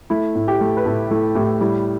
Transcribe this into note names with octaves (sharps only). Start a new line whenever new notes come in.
A3 E4
A2
G4
A3
B4
A2 A4
A3 E4
A2 G4
G3 E4